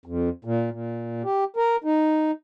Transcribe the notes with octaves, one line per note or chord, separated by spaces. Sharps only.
F2
A#2
A#2
G4
A#4
D#4